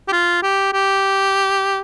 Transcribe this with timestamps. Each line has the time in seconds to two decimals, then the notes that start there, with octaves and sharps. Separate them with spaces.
0.08 G4
0.12 F4
0.43 G4
0.73 G4